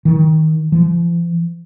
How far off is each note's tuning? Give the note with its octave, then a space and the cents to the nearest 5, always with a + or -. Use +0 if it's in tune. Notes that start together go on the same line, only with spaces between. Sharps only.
D#3 +20
F3 -45